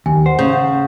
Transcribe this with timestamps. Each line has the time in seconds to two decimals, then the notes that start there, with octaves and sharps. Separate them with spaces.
0.06 D#2 G#5
0.26 C5 F#5
0.39 C#3 G6
0.53 F#5